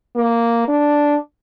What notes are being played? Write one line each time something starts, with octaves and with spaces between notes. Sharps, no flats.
A#3
D4